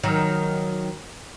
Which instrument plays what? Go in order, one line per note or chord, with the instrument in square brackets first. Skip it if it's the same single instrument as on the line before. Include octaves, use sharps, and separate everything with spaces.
[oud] D#3 F#3